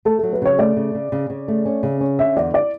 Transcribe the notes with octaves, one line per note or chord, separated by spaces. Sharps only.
A3 A4
F#3 A4
B4
C#3 C#5
A3 D5
C#3
C#3
C#3
C#3
A3
C#4
C#3
C#4
D3 E5
E2 D5
D5